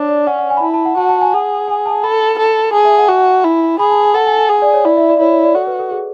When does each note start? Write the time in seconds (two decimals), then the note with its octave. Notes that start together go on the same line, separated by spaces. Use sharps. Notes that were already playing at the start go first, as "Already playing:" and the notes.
Already playing: D4 C#5
0.09 D5
0.27 C#4 F#5
0.39 F#5
0.50 G#5
0.57 B5
0.62 E4 A5
0.74 A5
0.85 F#5
0.97 F#4 A5
1.09 A5
1.21 G#5
1.32 G#4 F#5
1.68 G#5
1.86 A5
2.03 A4 B5
2.39 A4
2.73 G#4 A5
2.85 E5
2.98 F#5
3.09 F#4 G#5
3.44 E4
3.79 G#4 B5
3.91 A5
4.03 G#5
4.14 A4 F#5
4.27 G#5
4.39 G#5
4.50 G#4
4.62 D5
4.74 C#5
4.85 E4 D5
4.97 E5
5.09 D5
5.20 E4 C#5
5.32 C#5
5.44 D5
5.55 F#4 A4
5.67 B4
5.79 A4
5.91 G#4